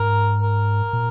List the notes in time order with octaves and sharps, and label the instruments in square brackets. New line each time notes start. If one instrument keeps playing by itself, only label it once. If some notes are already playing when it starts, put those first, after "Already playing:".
Already playing: [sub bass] G#2 [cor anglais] A#4
[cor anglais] A#4
[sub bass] A#2